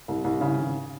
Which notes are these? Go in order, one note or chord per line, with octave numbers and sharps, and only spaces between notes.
C2
C2
C#3
G#1